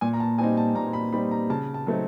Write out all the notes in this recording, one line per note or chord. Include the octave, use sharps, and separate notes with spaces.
A#2 G#5
A#5
A5
G3 C4 D#4 G#5
A5
A#2 A#5
B5
G3 C4 D#4 B5
A#5
C#3 A5
A5
F#3 A3 C4 D#4